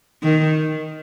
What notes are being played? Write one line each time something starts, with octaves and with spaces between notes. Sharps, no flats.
D#3